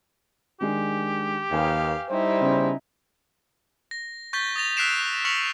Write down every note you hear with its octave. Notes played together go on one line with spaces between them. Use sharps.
D#3 G#3 D4 G4
D#2 B4 F5 G5 G#5
G3 D#4 E4 C5
C#3 B3 C#4
A#6
C#6 G6 A6 B6 G7
D#6 A6 A#6 F7
E6 F#6 B6 C7 D7 E7
C#6 F6 B6 C#7 F7 F#7